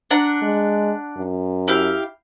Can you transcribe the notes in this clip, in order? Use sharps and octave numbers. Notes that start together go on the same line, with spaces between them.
D4 F#5 A#5
G#3
F#2
E4 G4 F5